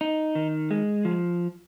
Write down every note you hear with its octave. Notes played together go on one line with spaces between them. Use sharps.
D#4
D#3
G#3
F3